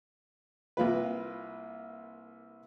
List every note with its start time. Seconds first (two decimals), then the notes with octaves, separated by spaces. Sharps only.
0.77 C2 A#3 F4 B4